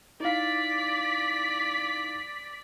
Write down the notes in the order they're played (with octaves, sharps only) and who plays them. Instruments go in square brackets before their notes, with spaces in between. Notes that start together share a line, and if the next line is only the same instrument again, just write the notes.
[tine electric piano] D#4 E4 F5 [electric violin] D5 B6